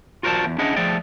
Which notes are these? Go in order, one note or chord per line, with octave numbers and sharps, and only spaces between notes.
F4 F#4 A#4 C5 D5 A5
E2
C#4 D4 E4 G#4 D#5 F#5
F3 A3 G#4 D5 G5